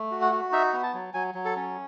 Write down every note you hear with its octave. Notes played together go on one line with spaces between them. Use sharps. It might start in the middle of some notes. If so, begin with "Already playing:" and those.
Already playing: A3
F#4
F#5
F#4
D#4 E5
B3
A5
F#3
F#3 G#5
F#3
A4
C#4